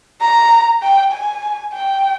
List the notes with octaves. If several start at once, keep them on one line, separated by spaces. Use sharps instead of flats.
A#5
G5
G#5
G5